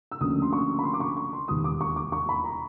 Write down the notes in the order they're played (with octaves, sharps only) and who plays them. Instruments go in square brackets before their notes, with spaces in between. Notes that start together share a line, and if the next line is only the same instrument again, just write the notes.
[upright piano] E6
D2 C#3 F3 A#3 C#4 D#6
C6
C#6
B5
C6
D6
C#6
C#6
C6
E1 D#2 D#3 G3 B3 D#6
D6
C#6
D6
C#6
B5
A#5